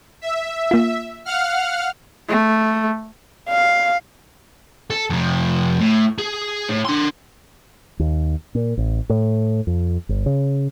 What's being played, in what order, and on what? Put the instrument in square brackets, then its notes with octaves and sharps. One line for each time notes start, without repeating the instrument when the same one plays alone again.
[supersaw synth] E5
[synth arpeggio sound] A#3 F4
[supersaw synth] F5 F#5 F6
[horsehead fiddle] A3
[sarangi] F5
[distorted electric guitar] A4
F2 C3
A2
G#4
A2
D4 C6
[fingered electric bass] D#2
A#2
A1
A2
F2
G1
C#3